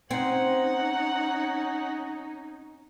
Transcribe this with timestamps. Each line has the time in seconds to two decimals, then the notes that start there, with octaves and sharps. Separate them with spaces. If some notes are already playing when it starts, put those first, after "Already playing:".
0.11 C4 C#4 D#4 F#5